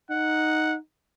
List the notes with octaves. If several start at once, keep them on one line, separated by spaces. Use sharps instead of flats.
D#4 F#5